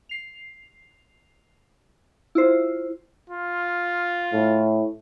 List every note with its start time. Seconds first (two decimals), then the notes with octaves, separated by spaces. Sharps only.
0.09 C7 F7
2.35 E4 F4 C5
3.29 F4
4.33 A2